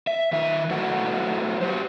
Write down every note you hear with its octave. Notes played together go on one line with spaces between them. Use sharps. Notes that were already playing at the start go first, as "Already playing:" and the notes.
E5
D#3 E5
F#3 A3 E4 F#4 B4 F#5
F#4 G4 C5